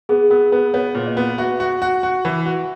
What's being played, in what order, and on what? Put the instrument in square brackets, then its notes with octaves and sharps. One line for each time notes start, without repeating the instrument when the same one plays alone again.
[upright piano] B3 [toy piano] G#4
[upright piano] B3 [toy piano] A#4
[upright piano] B3 [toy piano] B4
[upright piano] B3 [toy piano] C#5
[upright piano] A#2
[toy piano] D#5
[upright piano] B3
[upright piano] F#4 [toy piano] E5
[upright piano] F#4
F#4
F#4
E3
F#4